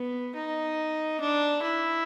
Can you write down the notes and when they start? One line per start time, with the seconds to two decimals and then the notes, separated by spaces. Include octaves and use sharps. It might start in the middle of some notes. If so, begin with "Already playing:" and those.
Already playing: B3
0.35 D#4
1.20 D4
1.62 E4